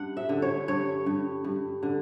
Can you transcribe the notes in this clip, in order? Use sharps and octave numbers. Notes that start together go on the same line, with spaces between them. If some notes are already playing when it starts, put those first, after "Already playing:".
Already playing: G2 F#5
E5
D3
C#5
G2 C#5
G2
G2
D3